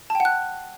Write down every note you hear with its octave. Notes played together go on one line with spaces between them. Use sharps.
A5
G5
F#5
F#6